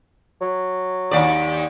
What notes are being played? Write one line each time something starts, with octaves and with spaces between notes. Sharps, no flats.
F#3
D#2 D5